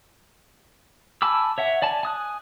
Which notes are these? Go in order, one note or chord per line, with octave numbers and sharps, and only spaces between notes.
G#5 A5 B5 D6 E6
C#5 E5 F#5
D5 G#5 A5
G#5 D#6 F#6